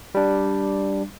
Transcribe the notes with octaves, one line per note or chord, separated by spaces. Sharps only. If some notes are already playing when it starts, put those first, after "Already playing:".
G3 D4